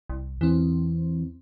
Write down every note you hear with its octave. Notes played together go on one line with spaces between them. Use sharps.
C2
E2 E3 C4